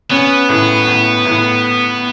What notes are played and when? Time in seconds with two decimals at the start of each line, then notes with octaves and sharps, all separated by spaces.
0.11 B3 C#4
0.49 A2
0.87 A2
1.25 A2